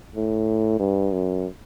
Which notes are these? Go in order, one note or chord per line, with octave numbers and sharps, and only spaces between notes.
A2
G2
F#2